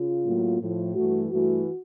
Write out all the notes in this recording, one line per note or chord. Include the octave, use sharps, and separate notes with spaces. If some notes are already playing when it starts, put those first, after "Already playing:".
Already playing: C#3 F4
A2 F#3 A#3
A2 F3 A3
G2 E3 A3 F#4
G2 E3 A3 F#4